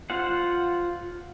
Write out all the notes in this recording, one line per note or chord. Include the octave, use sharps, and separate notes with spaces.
F4 C5 F#5